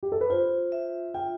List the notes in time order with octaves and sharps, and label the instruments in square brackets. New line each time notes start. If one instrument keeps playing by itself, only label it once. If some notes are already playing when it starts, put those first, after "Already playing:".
[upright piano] G4
A4
B4
[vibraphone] F4 [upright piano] C5
[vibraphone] E5
[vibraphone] F4 [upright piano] G5